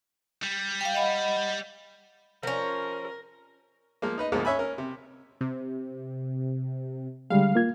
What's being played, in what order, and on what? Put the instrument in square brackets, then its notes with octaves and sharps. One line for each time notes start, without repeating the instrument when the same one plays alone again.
[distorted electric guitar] G3
[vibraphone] F5 G5
D#5 F#5 B5
[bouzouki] F3 C#4 [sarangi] A#4
[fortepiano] F3 G#3 A#3
D#4 B4 D#5
D2 G#2 F3 G#3 A#3
C#4 C#5 E5 G#5 B5
C#4 A#4
C3
[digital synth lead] C3
[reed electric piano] D3 G3 G#3 [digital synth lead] F5
[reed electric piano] A#3 F4 G#6